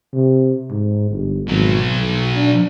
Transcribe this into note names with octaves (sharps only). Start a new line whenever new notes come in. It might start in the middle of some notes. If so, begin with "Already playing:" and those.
C3
G#2
G1
G#1 B2 F#3
B1
D4